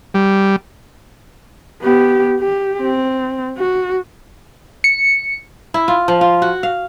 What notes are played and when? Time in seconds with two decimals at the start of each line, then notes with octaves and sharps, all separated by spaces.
0.14 G3
1.82 B3 G4
2.40 G4
2.81 C4
3.58 F#4
4.84 C#7
5.74 E4
5.88 F4
6.08 F3
6.21 F4
6.42 F#4
6.63 F5